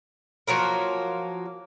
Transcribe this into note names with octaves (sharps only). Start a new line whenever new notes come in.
F3 F#3 A#3 A#4